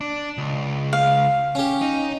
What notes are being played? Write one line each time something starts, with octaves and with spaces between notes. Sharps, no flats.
D4
C#2
F5
C#4 G4
D#4